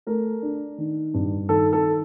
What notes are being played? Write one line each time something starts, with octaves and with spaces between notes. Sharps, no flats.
A3 A#4
D4
D#3
G2
D#3 A4
A4